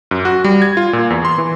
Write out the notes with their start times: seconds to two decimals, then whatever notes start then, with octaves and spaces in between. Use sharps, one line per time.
0.11 F#2
0.25 F#4
0.44 G3
0.62 G#6
0.77 F4
0.93 A#2
1.10 E2
1.25 C6
1.38 E3